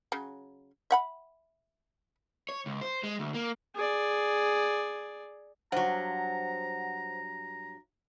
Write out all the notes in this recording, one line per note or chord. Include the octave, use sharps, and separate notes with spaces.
C#3 F#3
E5 F#5 B5
C#5
C#2
C5
G#3
D2
A#3
G#4 D5
G2 F#3 C5 F#5 A#5